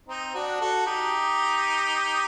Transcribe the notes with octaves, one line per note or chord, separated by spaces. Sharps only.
C4 D#4
D4 F#4
F#4 A4
D#4 G4